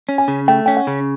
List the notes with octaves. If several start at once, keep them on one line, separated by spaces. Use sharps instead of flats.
C#4
G#5
C#3
A3 G5
C#4 G5
F#5
C#3